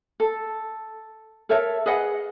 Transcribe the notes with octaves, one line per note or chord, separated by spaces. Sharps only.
A4
A4 A#4 C#5 E5
G#4 B4 D#5 F#5